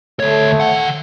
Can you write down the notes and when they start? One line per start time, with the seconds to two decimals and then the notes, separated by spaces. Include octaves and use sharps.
0.20 D2 A3 C#5
0.60 D#3 F#5